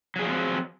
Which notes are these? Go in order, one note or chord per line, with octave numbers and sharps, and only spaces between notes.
F3 F#3 C4 F#4 G#4